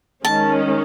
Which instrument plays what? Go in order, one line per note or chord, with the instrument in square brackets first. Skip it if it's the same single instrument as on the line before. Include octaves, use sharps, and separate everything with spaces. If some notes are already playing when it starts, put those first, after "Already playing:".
[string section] D#3 G#3 C#4 [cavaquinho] A5